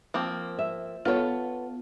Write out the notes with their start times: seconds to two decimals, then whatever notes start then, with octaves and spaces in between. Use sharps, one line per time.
0.14 F3 A#3 C4
0.59 E5
1.05 B3 F4 A4 C#5